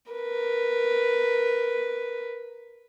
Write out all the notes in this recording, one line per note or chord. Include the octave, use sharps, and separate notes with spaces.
A#4 B4